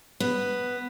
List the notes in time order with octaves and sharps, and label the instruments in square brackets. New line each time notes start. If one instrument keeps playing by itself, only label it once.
[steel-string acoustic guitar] B3